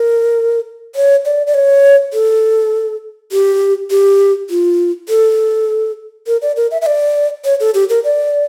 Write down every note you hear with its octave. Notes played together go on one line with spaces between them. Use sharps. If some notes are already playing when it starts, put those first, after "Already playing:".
Already playing: A#4
C#5
D5
D5
C#5
A4
G4
G4
F4
A4
A#4
D5
A#4
E5
E5
D5
C#5
A4
G4
A#4
D5